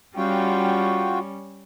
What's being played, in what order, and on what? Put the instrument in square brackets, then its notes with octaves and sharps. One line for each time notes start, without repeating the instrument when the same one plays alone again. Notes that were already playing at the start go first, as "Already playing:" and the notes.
[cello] G3 C#4 [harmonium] F4 F#4 G5